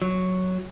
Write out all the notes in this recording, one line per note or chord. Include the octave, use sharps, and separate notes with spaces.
F#3